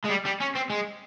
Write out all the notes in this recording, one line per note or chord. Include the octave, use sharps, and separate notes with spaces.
G#3
G3
G3
C#4
C4
G#3